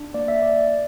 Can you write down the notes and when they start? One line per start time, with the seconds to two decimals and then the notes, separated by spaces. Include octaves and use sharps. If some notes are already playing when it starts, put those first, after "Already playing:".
Already playing: D4
0.14 A#3 D5
0.28 E5
0.35 A#3
0.42 D5